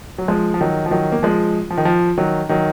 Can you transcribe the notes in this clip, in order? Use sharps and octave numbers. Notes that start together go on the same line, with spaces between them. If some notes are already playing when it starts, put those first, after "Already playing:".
F#3
F3 G#3
F3
D#3 F#3
F3
D#3 F#3
A#3
F3 G#3
F3
D#3
F3
D#3 F#3
D#3 F#3